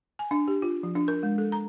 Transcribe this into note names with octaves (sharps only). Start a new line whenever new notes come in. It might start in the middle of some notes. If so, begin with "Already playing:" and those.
G#5
D4
G4
F4
F3
D4
A#4
G#3
A4
A#5